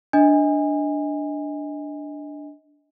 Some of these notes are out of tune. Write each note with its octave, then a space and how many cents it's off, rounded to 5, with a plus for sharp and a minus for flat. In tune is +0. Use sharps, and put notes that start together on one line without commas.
D4 +0 D#5 +25 G#5 -25